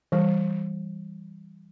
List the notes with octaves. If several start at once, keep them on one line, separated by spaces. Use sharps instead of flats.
E3 G3